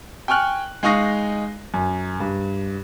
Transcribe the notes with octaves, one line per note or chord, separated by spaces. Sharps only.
G5 G#5 C#6 F6 F#6
G#3 D#4 F5 C#6 D#6 A#6
F#2
G2